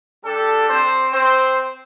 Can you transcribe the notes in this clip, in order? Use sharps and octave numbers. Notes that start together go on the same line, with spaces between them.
G3 D4 G4 A4
C4 C5
C4 C5